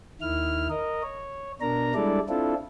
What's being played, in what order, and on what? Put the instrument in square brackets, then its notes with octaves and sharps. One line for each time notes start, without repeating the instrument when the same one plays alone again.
[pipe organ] D#2 D#3 E4 F6
A#4 D#5
C#5
B2 D4 A#4 A#5
G3 G#3 D4 E4 A4 D5
C4 D4 E4 F4 A4